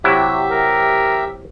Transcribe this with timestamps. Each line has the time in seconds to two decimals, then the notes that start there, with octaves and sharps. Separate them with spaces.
0.04 C3 F#3 E4 G4 E5
0.51 A#4